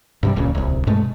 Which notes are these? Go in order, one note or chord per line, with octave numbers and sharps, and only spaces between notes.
G2 C3 G3
D1 C#2 A#2 C#3
D1 C2
G2 B2 G#3 A3